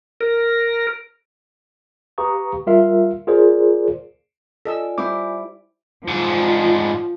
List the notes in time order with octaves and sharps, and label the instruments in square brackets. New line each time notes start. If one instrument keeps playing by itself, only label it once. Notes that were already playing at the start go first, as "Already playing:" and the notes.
[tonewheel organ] A#4
[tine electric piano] G4 B4 F5 A#5 C#6 D#6
G3 F4 A#4 E5 F5
F4 G#4 A#4 C5 D5
[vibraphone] F4 D5 G#5 [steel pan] A4 D#5 E6
[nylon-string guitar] G3 E4 C5 [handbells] D6
[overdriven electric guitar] G#2 D4 [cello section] F3